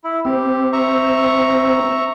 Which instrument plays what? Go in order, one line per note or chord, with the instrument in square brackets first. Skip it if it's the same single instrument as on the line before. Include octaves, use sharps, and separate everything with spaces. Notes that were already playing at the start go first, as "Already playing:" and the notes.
[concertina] E4
[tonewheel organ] C4 [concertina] G4
[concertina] E5 A#5 C#6